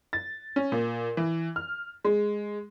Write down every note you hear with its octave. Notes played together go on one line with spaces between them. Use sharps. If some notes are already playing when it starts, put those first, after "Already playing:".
A6
C#4
A#2
E3
F6
G#3